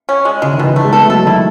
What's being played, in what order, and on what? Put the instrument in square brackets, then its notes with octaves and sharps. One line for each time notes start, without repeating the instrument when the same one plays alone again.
[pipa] C#4
G#3
[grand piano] C#3 [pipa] G#3
[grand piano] D#3
[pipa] B2 [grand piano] E3
[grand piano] E3 [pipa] A3
[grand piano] G#3
[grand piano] B3 [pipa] A4
[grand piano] A3
[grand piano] F#3 [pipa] A4
[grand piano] D#3 [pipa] E4